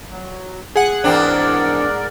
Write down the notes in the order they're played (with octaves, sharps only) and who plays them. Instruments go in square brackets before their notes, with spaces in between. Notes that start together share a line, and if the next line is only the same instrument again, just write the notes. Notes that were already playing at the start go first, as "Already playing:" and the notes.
[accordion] F#3
[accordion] A#2 [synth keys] G#4 F#5
[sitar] E2 C4 D4 [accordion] G#2 A#4 D5